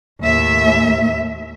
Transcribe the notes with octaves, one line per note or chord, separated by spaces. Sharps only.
D#2 A2 E5